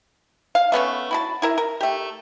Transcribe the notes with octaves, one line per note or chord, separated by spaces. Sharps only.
F5
A3 B3 C#4 A4
E4 F#4 A5
E4 A#4 E5
A#4
A3 G4